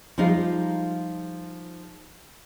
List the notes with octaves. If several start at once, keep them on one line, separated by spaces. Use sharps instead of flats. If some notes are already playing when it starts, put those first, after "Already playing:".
F3 G3 G#3 D#4 F4